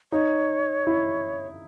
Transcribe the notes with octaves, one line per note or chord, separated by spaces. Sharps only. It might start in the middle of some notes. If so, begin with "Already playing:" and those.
D#4 C#5
E4